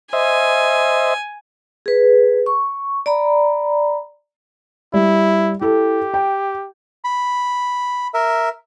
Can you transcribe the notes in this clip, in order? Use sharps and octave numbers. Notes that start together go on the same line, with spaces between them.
C5 D#5 E5 G#5
G#4 B4
C#6
D5 A#5 B5
G3 E4
E4 G4 A4
G5
B5
A#4 E5